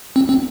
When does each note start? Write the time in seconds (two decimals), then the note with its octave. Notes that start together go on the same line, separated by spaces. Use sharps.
0.16 C4
0.29 C4